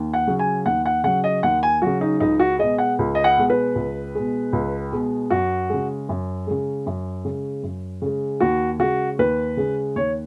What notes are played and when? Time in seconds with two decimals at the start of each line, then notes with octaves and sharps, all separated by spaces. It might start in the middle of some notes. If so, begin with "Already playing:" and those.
Already playing: D#2
0.14 F#5
0.27 C#3 F#3
0.39 G#5
0.65 D#2 F#5
0.86 F#5
1.04 C#3 F#3 F#5
1.24 D#5
1.43 D#2 F#5
1.63 G#5
1.82 C#3 F#3 F#4
2.01 D#4
2.20 C#2 D#4
2.39 F#4
2.59 B2 G#3 D#5
2.78 F#5
2.99 C#2
3.15 D#5
3.24 F#5
3.38 B2 G#3
3.50 B4
3.75 C#2
4.15 B2 G#3
4.53 C#2
4.92 B2 G#3
5.30 F#2 F#4
5.70 C#3 G#3
6.09 F#2
6.47 C#3 G#3
6.86 F#2
7.25 C#3 G#3
7.63 F#2
8.02 C#3 G#3
8.40 D#2 F#4
8.79 C#3 G#3 F#4
9.19 D#2 B4
9.57 C#3 G#3
9.96 D#2 C#5